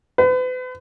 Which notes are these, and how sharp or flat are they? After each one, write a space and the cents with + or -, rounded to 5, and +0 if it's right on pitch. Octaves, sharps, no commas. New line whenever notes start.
B4 +40